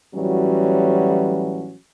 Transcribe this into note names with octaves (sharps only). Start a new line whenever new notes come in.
A2 E3 F#3 G3 C#4 F#4